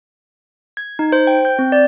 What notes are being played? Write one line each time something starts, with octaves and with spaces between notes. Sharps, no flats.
G#6
D#4
C5
G5
G6
C4
D5